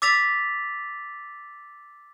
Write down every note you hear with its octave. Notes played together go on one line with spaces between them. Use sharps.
D6 E6 A6 B6 F7